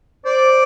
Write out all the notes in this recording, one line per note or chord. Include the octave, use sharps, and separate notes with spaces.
C5 D5